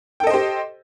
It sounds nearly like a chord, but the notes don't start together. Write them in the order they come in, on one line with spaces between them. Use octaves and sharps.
G5 A4 D#5 C5 G4